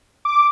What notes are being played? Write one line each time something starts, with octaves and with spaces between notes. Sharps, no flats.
D6